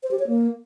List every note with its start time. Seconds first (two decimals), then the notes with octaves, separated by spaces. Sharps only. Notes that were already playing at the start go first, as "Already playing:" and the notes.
0.03 C5
0.11 G4
0.19 C#5
0.27 A#3